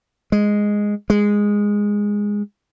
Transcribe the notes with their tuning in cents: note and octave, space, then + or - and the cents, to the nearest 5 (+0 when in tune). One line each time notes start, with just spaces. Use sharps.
G#3 -5
G#3 -10